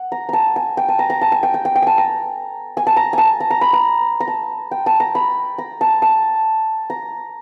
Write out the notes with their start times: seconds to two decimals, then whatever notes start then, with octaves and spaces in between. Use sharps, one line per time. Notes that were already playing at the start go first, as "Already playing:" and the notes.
Already playing: F#5
0.12 A#5
0.29 A5 A#5
0.56 G#5
0.77 G5
0.89 A5
0.99 A#5
1.10 A#5
1.21 A5
1.32 G#5
1.43 G5
1.54 G5
1.65 G5
1.75 G5
1.82 G#5 A5
1.98 A#5
2.77 G#5
2.87 A5
2.97 A#5
3.13 G#5 A5
3.40 A#5
3.51 A#5
3.61 B5
3.73 A#5
4.20 A#5
4.28 A5
4.71 G5
4.86 A5
5.00 A#5
5.15 B5
5.58 A#5
5.81 A5
6.02 A5
6.90 A#5